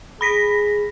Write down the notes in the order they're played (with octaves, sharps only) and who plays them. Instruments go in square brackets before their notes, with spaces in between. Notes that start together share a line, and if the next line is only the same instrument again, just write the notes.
[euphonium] G#4 [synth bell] B5 A#6 B6